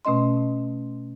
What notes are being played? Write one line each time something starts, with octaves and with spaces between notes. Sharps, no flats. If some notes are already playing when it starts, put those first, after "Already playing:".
B2 A3 C#4 D#5 C6